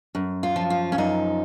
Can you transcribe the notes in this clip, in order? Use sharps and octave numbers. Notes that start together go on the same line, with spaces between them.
F#2
F4
F3
F4
C#4
F#2 D#4